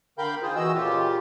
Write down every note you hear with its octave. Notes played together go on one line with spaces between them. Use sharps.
D3 A#4 F5 G5 B5 G6
D#3 F4 G#4 C5
E2 E3 F#4 D#5 E6
A#2 C#3 F4 G4